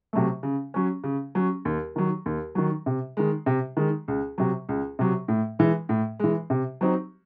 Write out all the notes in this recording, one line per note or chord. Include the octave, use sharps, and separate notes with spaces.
C3 F#3 A3
C#3
F#3 C#4
C#3
F#3 C#4
D#2
D#3 F#3
D#2
D#3 F#3
C3
D#3 G#3
C3
D#3 G#3
C#2
C3 F#3
C#2
C3 F#3
A2
E3 G#3
A2
E3 G#3
C3
F#3 C4 D#4